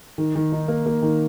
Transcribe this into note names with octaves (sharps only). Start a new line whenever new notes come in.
D#3
D#3
D#4
A#3
A#3
D#3